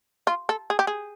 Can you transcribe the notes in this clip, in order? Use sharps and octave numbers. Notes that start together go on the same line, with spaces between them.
F4
A4
G#4
G4
G#4